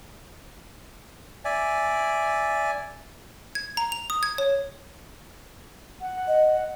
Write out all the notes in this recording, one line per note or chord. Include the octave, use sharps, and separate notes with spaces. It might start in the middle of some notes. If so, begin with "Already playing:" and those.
D5 E5 G#5
G#6
A#5
F7
D#6
G#6
C#5
F#5
D#5